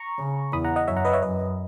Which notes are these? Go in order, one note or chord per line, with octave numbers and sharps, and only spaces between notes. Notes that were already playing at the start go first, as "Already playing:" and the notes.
Already playing: A#5 C#6
C#3
E2 B5 D#6
F#5 A#5
D#5 F#5
F#2 C#5 E5
F#5 A#5
B4 D#5
C#5 E5
F#2 B4 D#5